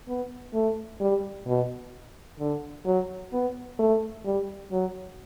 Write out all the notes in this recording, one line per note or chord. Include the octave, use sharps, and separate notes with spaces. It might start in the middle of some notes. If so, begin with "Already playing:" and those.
B3
A3
G3
B2
D3
F#3
B3
A3
G3
F#3